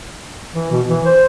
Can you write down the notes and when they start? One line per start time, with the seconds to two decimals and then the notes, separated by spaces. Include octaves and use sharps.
0.54 E3
0.71 B2
0.89 E3
1.06 C5